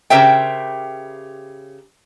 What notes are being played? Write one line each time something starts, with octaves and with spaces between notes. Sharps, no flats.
C#3 G4 A#4 C5 E5 G5